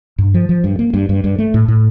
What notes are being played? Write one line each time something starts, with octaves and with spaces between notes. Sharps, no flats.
G2
F3
F3
G2
A#3
G2
G2
G2
A3
A2
A2